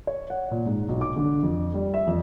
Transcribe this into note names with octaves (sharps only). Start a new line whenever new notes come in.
C#5
F#5
A#2
G#2
B1
D6
D3
F2
G3
E5
F2